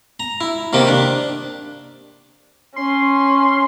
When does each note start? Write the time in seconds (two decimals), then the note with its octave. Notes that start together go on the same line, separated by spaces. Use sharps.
0.20 A#5
0.41 E4
0.73 C3 D#3 A#3 G4
0.88 D4
2.76 C#4 C6